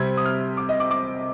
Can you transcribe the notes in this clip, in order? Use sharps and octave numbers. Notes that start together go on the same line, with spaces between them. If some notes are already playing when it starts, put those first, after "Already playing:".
Already playing: C3 G3 C4 G#6
D#6
F6
D6
D#5
D6
D6